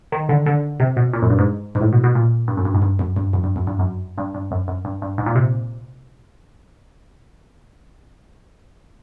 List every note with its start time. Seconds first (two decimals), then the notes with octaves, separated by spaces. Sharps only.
0.12 D#3
0.29 D3
0.46 D3
0.80 C3
0.97 B2
1.13 A#2
1.22 F#2
1.30 G2
1.39 G#2
1.75 G#2
1.81 A2
1.93 B2
2.04 B2
2.15 A#2
2.48 G2
2.57 F#2
2.65 G2
2.74 G#2
2.82 G2
2.99 F#2
3.16 G2
3.33 F#2
3.44 G2
3.56 F#2
3.67 G2
3.79 F#2
4.18 G2
4.35 G2
4.51 F#2
4.68 F#2
4.85 G2
5.02 G2
5.18 G#2
5.26 A#2
5.35 C3